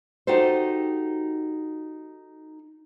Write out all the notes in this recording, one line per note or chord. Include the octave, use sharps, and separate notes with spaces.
D#4 F#4 G4 A4 C5